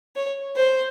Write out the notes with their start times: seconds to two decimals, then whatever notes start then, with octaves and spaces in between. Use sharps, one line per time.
0.16 C#5
0.57 C5